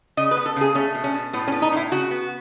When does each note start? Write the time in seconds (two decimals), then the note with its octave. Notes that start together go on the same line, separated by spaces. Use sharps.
0.17 C#3 D#5
0.31 B4
0.37 B3
0.46 A4
0.56 C#3
0.61 G#4
0.75 A3 C#4
0.95 B2
1.04 C#4
1.14 B2
1.33 A2 B3
1.48 C#4
1.52 B3
1.62 D#4
1.72 A2 E4
1.92 C#3 F#4
2.11 B3